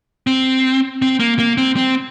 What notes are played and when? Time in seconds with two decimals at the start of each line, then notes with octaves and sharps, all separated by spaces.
0.27 C4
1.02 C4
1.20 A#3
1.39 A#3
1.57 C4
1.77 C4